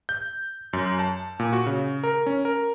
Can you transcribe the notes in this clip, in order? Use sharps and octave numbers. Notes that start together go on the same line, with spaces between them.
G6
F#2
A5
A#2
F#4
C#3
A#4
C#4
A#4